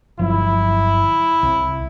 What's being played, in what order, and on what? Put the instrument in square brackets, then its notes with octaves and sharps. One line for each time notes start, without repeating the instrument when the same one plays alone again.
[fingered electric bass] G1 F3 F#3 [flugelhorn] E4
[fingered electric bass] C2